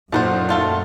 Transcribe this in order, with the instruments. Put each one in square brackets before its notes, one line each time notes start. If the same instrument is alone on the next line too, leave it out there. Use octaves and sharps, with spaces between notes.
[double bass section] F#2 [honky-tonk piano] A#2 D#4 F#4 [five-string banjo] A4 B4 C5
[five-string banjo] A3 F4 A4